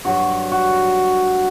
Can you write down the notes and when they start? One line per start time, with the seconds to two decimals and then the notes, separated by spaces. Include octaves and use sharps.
0.05 G2 F#3 F#4
0.52 F#4